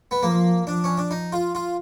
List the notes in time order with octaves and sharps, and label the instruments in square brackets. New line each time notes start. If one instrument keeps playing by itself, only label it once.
[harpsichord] B3
[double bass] F3 [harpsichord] A#3
[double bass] F3 [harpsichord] D4
[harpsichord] C#4
D4
D#4
F4
F4